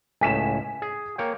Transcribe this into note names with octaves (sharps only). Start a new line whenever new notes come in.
C#2 A2 G#5 B6 E7
G#4
A#3 C#5 G5